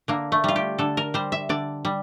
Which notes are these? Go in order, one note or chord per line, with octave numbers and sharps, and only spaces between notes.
D3 A#3
A3
G3 F4
G4
D3 A4
A#4
G3 C5
E5
D3 D5
G3